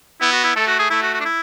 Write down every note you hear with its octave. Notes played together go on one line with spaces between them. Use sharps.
B3 E4
F#4
E4
A3 A4
F#4
G#4
A3 E4
F#4
F#4
D4
E4